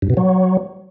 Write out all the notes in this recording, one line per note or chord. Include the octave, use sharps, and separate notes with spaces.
G2
B2
F#3